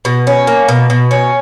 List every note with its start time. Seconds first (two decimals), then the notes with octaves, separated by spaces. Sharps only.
0.05 B2
0.27 C#4
0.47 A#3
0.68 B2
0.90 B2
1.11 C#4